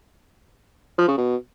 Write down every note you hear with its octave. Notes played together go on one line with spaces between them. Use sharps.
F3
C#3
B2